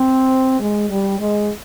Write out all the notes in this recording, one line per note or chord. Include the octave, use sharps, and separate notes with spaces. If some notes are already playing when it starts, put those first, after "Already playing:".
Already playing: C4
G#3
G3
G#3